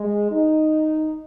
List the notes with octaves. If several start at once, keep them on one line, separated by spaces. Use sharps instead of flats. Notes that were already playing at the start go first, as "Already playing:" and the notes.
Already playing: G#3
D#4